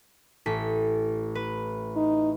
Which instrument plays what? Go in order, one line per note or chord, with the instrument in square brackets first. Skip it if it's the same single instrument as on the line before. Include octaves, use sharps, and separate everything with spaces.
[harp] A1 A4 B6
B4
[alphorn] D#4